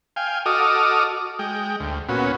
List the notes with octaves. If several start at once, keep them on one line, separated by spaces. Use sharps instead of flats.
F5 G5 G#5
F#4 A4 D#5 D6 D#6 F6
G#3 G5
D2
A#2 B3 C#4 F#4